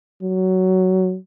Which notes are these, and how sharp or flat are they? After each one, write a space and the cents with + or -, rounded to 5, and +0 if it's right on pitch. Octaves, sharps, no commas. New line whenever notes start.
F#3 +15